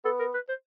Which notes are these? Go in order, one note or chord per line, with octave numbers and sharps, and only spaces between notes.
B3 A4
A#4
B4
C5